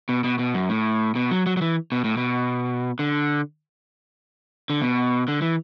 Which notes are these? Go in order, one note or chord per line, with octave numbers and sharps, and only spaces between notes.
B2
B2
B2
F#2
A2
B2
F#3
F#3
F#3
E3
B2
A2
B2
D3
D3
B2
D3
E3